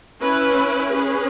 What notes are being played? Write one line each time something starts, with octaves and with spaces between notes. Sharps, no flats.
C#4 E4 B4
C#4 G#4 B4